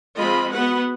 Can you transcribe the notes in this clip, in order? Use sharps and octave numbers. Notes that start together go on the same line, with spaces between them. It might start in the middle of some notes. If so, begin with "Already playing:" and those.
F3 G#3 C4 F4 D#5 B5
B3 F#4 B4 F#5